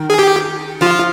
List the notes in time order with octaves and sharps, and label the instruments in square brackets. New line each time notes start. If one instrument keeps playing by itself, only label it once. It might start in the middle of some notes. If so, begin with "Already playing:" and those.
Already playing: [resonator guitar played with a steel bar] D#3
[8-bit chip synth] G#4
G4
[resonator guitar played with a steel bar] F3 [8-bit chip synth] F4